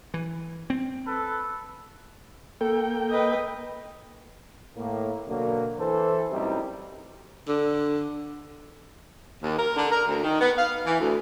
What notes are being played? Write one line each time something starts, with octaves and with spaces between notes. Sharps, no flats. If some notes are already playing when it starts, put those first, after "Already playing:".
E3
C4
A4 B4
A#3 A4 G5
B4 D#5
A2 A#3
B2 D3 F#3 A#3
E3 A4 C5
C2 F#2 A2 C3 G3 D#4
D3
D#2
A#4
D3
A#4
D2
D#3
B3
F5
E3
D2